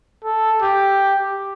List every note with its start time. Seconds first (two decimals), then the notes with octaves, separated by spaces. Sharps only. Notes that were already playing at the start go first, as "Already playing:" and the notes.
0.24 A4
0.62 G4